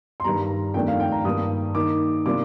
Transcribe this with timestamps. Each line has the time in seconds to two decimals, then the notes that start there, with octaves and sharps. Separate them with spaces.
0.20 C6
0.24 G2 D#3 G3 A#5
0.74 F2 D#3 A3 D4 G5
0.88 F5
1.00 G5
1.12 A#5
1.25 G2 D#3 G3 A#3 D#6
1.75 D#3 A#3 D#4 D6
2.26 C3 G3 A#3 D4 F4 D6